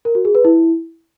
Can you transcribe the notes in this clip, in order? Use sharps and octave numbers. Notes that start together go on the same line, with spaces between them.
A#4
F#4
G#4
B4
E4